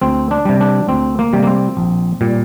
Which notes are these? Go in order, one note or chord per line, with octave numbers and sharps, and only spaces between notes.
D2 C4
D4
C3 G3
D4
D2 C4
A#3
C3 G3
A#3
C4
A#1
A#2 G3